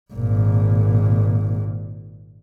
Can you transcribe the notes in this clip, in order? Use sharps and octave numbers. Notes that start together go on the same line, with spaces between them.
G#1 A#2